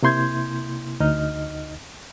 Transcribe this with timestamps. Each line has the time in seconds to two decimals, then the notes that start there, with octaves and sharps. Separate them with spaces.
0.02 C3 A#3 E4 C6 G6 G#6
1.00 D2 D#4 D#5 F6